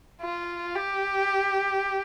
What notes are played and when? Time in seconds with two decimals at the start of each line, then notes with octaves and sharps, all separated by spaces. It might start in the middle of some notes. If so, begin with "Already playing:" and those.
0.21 F4
0.75 G4